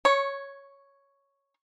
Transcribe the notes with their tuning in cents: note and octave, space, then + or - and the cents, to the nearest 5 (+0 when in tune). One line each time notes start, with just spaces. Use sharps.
C#5 +0 C#6 -20